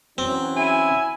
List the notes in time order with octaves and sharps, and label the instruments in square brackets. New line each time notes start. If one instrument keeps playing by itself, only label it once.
[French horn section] E3 F#3 C#4 [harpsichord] C4
[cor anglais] E4 [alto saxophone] G#5